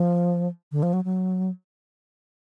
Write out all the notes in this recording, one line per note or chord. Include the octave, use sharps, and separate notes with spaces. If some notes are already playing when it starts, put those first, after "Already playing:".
Already playing: F3
D3
F3
F#3
F#3